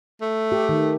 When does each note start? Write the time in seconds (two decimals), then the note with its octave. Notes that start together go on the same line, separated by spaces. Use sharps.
0.21 A3
0.52 G4
0.69 D#3